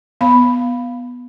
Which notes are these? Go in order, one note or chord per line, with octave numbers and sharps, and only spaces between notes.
B3 F5 B5